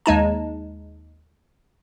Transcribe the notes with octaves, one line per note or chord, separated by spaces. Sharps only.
D#2 G#3 D#4 A5